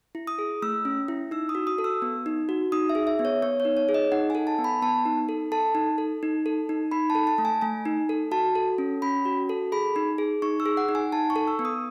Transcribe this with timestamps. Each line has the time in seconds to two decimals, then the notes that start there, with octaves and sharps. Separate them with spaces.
0.15 E4
0.27 D#6
0.39 G#4
0.62 A3 E6
0.85 C#4
1.08 E4
1.31 D#4 E6
1.49 D#6
1.55 F#4
1.67 D#6
1.78 A4
1.84 E6
2.02 B3
2.26 D#4
2.49 F#4
2.72 D#4 D#6
2.89 E5
2.95 G#4
3.07 E5
3.19 B3
3.25 C#5
3.42 B3 C#5
3.60 C#5
3.65 D#4
3.77 C#5
3.89 G#4
3.94 D#5
4.12 D#4 F#5
4.30 G#5
4.35 A4
4.47 A5
4.58 B3
4.64 B5
4.82 B3 A5
5.06 D#4
5.29 A4
5.52 A4 A5
5.75 D#4
5.98 A4
6.23 D#4
6.46 A4
6.69 D#4
6.91 D#4 B5
7.10 A5
7.15 A4
7.27 A5
7.38 A3
7.45 G#5
7.61 A3 G#5
7.85 D#4
8.09 A4
8.31 F#4 A5
8.55 A4
8.78 C#4
9.02 C#4 B5
9.25 F#4
9.49 A4
9.72 G#4 B5
9.96 D#4
10.18 G#4
10.42 D#4 C#6
10.60 E6
10.66 G#4
10.77 F#5
10.89 D#4
10.95 G#5
11.12 D#4 A5
11.30 C#6
11.36 A4
11.48 E6
11.59 B3
11.65 D#6